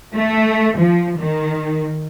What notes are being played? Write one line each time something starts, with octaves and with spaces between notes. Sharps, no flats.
A3
F3
D#3